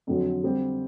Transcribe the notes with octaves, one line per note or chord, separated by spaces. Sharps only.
F2 D3 F#3
D3 G3 C4